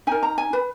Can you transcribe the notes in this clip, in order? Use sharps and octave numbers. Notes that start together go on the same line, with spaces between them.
D#4 A#4 G#5
A#5
G#5
B4